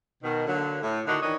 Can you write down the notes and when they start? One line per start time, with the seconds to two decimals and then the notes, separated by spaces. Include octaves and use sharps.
0.23 B2 D#3
0.47 D3 F#3 A#3
0.82 A2
1.06 A2 D3 D#3 D4 D#4 F#4
1.22 D#3 E3 D4 B4 C#5 D#5